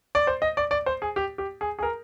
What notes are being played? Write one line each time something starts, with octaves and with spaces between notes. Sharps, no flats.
D5
C5
D#5
D5
D5
C5
G#4
G4
G4
G#4
G#4
A#4